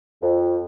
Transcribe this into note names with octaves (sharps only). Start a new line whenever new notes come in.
F2